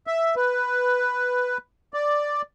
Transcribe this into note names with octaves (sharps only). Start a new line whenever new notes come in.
E5
B4
D5